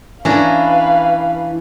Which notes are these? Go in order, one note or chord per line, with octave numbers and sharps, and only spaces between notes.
E3 C#4 D4 B4 F5 A#5